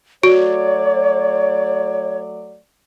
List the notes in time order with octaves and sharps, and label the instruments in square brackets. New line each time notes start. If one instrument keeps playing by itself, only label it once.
[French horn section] F#3 A3 D5 [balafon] F#4 [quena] C#5